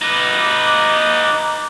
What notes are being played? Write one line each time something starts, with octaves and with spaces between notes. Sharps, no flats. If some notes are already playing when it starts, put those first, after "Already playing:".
D#4 B4 D6